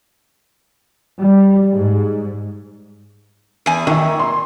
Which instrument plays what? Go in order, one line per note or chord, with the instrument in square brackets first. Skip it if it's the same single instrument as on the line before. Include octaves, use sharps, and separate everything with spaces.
[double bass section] G3
G#2
[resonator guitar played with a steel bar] E2 G#5
[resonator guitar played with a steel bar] A#2 [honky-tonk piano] D#3 E5
[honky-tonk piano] C6